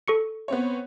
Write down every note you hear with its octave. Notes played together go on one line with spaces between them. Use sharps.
A4 C#6 C#7
B3 C4 C#5